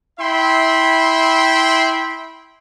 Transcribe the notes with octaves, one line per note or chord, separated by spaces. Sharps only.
E4 E5 G5 B5 C6